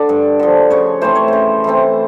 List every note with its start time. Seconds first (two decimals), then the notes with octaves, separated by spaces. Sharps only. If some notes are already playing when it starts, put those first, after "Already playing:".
Already playing: D3 D5
0.09 G2
0.39 D3 F3
0.70 C#3 C#5
1.01 E3 A3 C4 C5
1.15 C#5
1.28 C#3 C5
1.64 E3 A3 C4